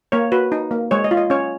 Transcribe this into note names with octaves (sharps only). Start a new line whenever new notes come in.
A#3 C#5
F#4 B4
D#4
A#3
G#3 C#5
D#5
F4
D#5
C#4 C#5